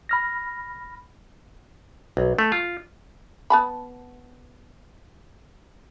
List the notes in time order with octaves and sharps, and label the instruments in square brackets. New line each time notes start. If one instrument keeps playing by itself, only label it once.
[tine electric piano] B5 F6 A#6
[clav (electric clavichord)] B1
A3
F4
[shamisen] B3 A5 B5